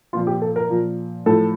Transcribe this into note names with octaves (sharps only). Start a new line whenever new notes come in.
A#2 F3 F4
G4
A4
A#4
A#2 F3
A2 F3 A4